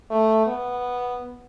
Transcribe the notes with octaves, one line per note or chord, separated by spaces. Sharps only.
A3
B3